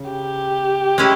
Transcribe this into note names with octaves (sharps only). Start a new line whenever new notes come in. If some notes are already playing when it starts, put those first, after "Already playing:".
Already playing: C#3
G4
G#3 C#4 E4